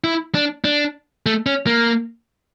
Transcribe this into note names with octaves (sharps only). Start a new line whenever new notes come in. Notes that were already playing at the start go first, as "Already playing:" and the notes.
E4
D4
D4
A3
C#4
A#3